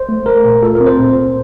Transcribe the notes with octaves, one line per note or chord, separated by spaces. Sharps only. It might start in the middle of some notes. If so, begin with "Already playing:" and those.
Already playing: C5
A3
A3 A#4
A#2
F4 A4
A#4
C4
C5
A#2
A#2